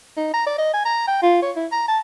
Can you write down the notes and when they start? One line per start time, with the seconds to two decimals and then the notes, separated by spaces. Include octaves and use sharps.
0.17 D#4
0.33 A#5
0.46 D5
0.58 D#5
0.73 G#5
0.85 A#5
1.07 G5
1.22 F4
1.42 C#5
1.56 E4
1.72 A#5
1.88 A5